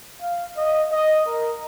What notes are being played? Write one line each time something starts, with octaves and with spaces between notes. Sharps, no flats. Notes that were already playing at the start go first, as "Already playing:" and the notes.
F5
D#5
D#5
A#4